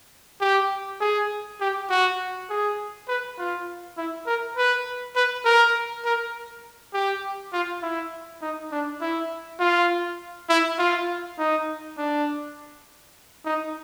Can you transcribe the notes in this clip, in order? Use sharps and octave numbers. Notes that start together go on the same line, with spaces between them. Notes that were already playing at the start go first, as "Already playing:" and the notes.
G4
G#4
G4
F#4
G#4
B4
F4
E4
A#4
B4
B4
A#4
A#4
G4
F4
E4
D#4
D4
E4
F4
E4
F4
D#4
D4
D#4